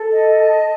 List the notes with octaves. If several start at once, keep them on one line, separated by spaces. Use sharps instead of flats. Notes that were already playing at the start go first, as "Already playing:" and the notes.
Already playing: A4
D#5
A5